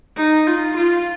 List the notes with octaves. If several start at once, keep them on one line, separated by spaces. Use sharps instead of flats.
D#4
F4
F4